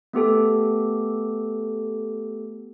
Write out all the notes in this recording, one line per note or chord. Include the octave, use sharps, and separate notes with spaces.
A3 B3 G4 A4